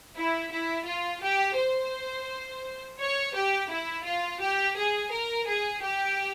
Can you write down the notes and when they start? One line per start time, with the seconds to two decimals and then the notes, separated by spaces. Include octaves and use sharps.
0.17 E4
0.51 E4
0.86 F4
1.22 G4
1.57 C5
2.99 C#5
3.34 G4
3.70 E4
4.04 F4
4.40 G4
4.76 G#4
5.11 A#4
5.46 G#4
5.82 G4